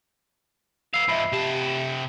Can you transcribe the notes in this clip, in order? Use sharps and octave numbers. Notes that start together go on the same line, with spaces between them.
B3 F5 E6 C7
G#2 F3 E5 B5
C3 G4 A5